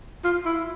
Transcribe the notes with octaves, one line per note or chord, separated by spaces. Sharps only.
F4
E4